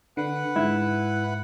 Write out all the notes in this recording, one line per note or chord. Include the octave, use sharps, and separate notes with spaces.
D3 B4 F#5
G#2 E4